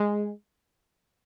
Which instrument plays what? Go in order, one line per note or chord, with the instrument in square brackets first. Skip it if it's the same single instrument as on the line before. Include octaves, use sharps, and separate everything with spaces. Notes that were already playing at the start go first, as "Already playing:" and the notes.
Already playing: [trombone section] G#3